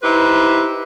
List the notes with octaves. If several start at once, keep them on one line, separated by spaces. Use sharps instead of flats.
D#4 E4 G4 B4 C5